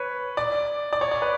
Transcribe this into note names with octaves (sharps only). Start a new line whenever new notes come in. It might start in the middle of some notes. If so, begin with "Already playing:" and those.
Already playing: B4 C#5
D5
D5
C#5
D5
B4